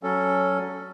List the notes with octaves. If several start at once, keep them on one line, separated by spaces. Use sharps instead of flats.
F#3 C#4 A4